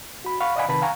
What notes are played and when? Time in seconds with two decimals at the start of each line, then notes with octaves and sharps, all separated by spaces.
0.24 F#4 B5
0.40 F5 F#5 B5 C#6
0.56 D5 D#5 F5 F#5 G#5 B5
0.68 C3 D#3 B4 A5 B5
0.82 F5 F#5 G#5 A#5 C#6